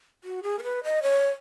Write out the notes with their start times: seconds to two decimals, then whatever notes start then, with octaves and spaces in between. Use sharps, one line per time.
0.24 F#4
0.43 G#4
0.59 A#4
0.63 B4
0.84 D#5
1.03 C#5